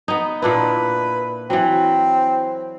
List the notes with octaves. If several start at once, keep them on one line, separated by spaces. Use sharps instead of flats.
B3 D#4
A#2 D4 E4 B4
E3 F#3 C4